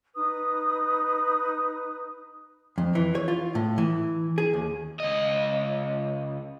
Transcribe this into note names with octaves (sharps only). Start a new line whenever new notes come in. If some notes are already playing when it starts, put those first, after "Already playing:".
D#4 B4 D#6
F2
E3
C#5
F4
A2
E3
G#4
D#2
C#2 D#5